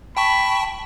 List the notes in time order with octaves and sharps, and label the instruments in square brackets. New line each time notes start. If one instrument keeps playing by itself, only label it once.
[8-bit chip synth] G5 A5 C#6 [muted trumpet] B5